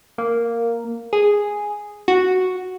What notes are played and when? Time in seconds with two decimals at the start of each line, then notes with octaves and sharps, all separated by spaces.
0.18 A#3
1.13 G#4
2.08 F#4